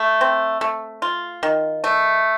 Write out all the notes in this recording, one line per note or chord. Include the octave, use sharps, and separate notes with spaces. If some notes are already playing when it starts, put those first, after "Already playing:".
Already playing: A3
C4
A3
F4
D#3
A3